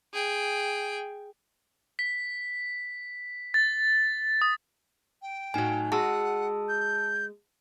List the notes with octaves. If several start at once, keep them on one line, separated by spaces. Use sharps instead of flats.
G#4 G5
B6
A6
D#6
G5
A2 F#3 D#4 G#5
G#3 F#4 F#5 A5 E6
G6